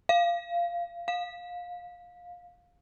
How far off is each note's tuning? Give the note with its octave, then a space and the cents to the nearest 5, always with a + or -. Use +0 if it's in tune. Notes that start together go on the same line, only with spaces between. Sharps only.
F5 -15
F5 +20